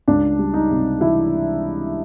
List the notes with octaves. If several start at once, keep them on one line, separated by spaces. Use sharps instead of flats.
C#2 D4
G3
D#4
C3
E3 E4